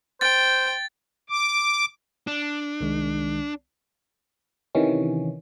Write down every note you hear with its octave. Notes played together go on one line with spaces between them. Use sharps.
C5 G5 A6
D6
D4
C2 D#3 G#3
C3 D#3 E3 C#4